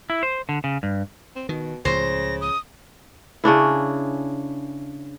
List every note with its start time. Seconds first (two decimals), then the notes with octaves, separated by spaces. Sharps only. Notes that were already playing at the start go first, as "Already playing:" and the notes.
0.10 E4
0.23 C5
0.49 D3
0.64 C#3
0.83 G2
1.36 C4
1.49 B2 D#3
1.85 C#2 A2 C#3 F3 C5 A#6
2.41 D#6
3.44 C#3 C#4 D4 E4